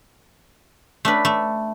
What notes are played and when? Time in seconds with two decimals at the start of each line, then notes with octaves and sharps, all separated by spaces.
1.05 A3 D4 B4
1.25 A3